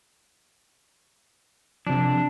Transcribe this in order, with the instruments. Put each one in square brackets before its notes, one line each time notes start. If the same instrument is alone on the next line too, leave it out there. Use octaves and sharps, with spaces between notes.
[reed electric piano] C3 F3 [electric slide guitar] D4